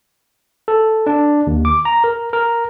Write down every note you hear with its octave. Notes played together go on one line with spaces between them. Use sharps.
A4
D4
D#2
D6
A#5
A#4
A#4